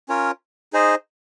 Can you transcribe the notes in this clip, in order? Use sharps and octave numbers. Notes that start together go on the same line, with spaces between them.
C#4 F4 A#4 C#5
D#4 G#4 C5 D#5